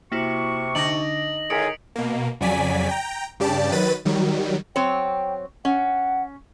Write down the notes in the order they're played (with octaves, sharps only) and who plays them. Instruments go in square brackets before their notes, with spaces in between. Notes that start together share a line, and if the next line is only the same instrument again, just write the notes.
[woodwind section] C3 C#6 [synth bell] A#3 E4 F#4
[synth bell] D3 D4 [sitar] D#4 [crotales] A#6 F#7
[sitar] A2 [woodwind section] D#3 D#4 G#4 [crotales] D#6 D7 [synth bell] B6 C#7
[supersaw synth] B2 A#3
F2 C#3 F#3 D5 G#5 B6
G5 A#5
G2 C#3 G4 D5 A5
D#3 F#3 B4 B5 A6 D#7
D#3 F#3 G3
[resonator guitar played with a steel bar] F#3 C4 C#5 [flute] G5
[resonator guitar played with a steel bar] C#4 [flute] F#5